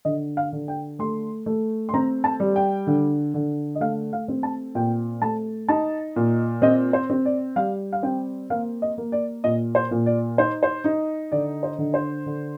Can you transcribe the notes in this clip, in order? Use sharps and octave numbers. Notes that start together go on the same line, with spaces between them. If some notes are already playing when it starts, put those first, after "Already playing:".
D3 D#5
F5
D3
G5
A3 C6
A3
C6
C4 A#5
A5
G3
G5
D3
D3
D#5
A3 F5
F5
C4
A5
A#2 G5
A3 A5
D#4 A5
A#2
C4 D#5
C5
C4
D5
G3 F5
F5
C4 G5
A#3 F5
D#5
A#3
D5
A#2 D#5
C5
A#2
D5
D#4 C5
C5
D#4
D3 D5
C5
D3
C5
D3